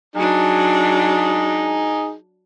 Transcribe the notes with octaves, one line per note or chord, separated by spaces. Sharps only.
F#3 D4 D#4 G#4